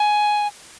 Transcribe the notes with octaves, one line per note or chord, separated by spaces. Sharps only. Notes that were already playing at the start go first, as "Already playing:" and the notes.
Already playing: G#5